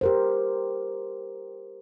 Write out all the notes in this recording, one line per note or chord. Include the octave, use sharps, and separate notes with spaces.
G4 A#4 C5